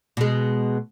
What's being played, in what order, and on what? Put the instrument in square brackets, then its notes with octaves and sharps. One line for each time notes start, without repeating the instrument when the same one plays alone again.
[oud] B2 G#3